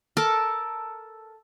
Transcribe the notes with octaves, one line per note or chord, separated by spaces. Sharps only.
A4 A#4 D6